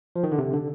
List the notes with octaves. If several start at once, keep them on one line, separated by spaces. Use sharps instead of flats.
F3
D#3
D3
C3
D3